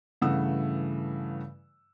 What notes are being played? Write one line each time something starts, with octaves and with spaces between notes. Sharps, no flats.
G2 C#3 E3 A3 F#5 E6